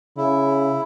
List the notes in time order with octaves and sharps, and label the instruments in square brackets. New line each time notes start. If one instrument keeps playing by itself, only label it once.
[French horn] C#3 [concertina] E4